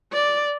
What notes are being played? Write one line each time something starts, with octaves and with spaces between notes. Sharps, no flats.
D5